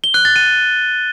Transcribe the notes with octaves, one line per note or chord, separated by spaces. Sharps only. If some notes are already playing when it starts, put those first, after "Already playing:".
G7
F#6
A6
D#7